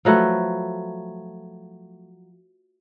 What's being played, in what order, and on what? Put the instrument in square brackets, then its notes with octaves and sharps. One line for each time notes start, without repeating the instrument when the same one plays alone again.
[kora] F3 F#3 A3 B4